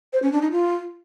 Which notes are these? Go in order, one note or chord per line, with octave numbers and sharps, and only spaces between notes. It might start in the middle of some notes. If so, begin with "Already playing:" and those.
C5
C#4
D4
D#4
F4